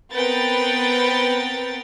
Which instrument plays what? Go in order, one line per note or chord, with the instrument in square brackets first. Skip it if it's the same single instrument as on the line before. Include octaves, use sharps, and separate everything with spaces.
[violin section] B3 C4 A#4 B4 G5 A6